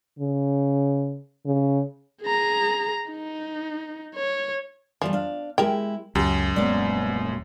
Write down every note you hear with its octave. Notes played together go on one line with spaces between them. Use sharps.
C#3
C#3
G#4 A#5
D#4
C#5
E3 F3 G3 A3
D4 F5
G#3 E4 G4 A#4 G5
C#2 F#2 G4
D#1 G#3 A#3 B3 C#4 D5